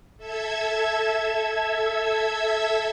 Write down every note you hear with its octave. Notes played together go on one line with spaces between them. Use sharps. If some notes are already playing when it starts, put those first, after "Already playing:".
A4 E5 E6 G#6